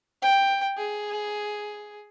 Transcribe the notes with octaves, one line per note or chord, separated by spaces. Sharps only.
G5
G#4